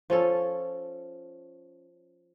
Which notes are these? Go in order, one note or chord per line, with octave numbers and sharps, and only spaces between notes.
F3 C#4 A4